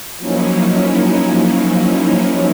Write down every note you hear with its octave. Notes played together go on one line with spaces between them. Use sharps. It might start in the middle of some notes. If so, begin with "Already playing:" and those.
F3 F#3 A#3 C#4 D#4 E4